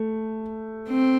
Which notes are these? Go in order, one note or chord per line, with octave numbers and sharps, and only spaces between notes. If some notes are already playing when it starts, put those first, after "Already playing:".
Already playing: A3
C4